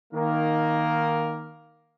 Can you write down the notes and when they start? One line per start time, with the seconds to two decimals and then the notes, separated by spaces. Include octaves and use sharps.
0.13 D#3 A#3 A#4